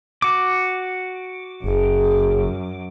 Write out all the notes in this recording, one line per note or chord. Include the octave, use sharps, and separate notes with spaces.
F#4 D6
F#1 F#2 G#4